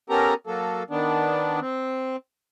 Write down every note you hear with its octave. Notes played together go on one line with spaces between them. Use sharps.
B3 C#4 G4 A4 A#4 A#5
F#3 A#3 A4
D#3 B3 D4
C4